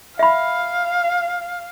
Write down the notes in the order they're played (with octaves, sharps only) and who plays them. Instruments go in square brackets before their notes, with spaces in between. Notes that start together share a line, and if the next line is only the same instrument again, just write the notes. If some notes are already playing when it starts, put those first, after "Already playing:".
[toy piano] E5 B5 [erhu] F5